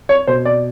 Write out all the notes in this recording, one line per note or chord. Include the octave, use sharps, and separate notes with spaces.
C#5
B2 C5
D5